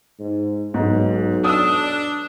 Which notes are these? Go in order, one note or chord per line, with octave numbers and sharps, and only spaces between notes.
G#2
B1 G#2
D4 D#6 E6